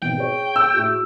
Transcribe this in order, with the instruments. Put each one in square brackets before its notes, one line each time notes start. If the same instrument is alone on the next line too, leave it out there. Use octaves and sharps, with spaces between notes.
[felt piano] G#1 B2 [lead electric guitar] G5
[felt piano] G#4 C#5
[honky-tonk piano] E6
[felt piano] A2 F#4 G#4